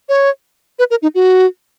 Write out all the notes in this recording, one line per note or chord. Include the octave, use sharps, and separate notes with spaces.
C#5
B4
A#4
D#4
F#4